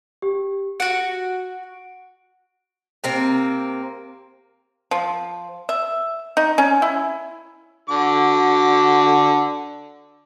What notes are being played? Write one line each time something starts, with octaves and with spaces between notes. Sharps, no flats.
G4
F#4 F#5 D7
C3 A#3 C4
F3
E5
D#4
C#4
E4
D3 F#4 D6